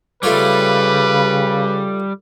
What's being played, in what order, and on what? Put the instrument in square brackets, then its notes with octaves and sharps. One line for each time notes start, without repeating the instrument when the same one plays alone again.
[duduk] C#3 [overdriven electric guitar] G3 [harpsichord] A3 F4 C#5 [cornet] B4